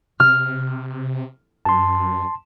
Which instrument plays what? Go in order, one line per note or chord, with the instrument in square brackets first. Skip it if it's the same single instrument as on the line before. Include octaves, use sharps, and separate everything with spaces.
[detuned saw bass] C3 [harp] F6
[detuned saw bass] F#2 [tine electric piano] A5 C6